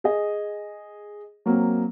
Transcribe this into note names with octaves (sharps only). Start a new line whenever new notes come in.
G#4 D#5
F#3 A#3 C4